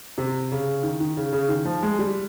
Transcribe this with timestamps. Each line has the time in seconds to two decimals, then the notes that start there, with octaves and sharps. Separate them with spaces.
0.18 C3
0.52 C#3
0.83 D#3
1.00 D#3
1.17 C#3
1.33 C#3
1.49 D#3
1.65 F3
1.83 G#3
1.99 G3